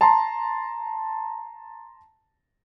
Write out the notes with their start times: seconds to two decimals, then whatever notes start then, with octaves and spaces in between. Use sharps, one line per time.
0.01 A5 A#5 C6